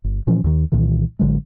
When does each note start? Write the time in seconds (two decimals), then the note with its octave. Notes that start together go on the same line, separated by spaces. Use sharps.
0.04 G1
0.27 A#2 E3 F3 C#4
0.44 D#2 D#3
0.72 C2 A#2 D#3 E3
1.19 A1 D3 F#3 G#3